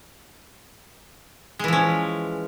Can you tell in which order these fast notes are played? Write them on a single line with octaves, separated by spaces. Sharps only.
G#3 E3 F3 C#4